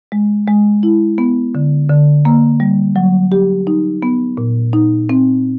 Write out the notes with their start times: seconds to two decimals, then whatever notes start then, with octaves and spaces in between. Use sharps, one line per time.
0.12 G#3
0.48 G#3
0.83 E4
1.18 B3
1.55 D3
1.89 D3
2.25 A#3
2.60 G3
2.96 F#3
3.32 G4
3.67 D#4
4.03 B3
4.37 A#2
4.73 D#4
5.09 C4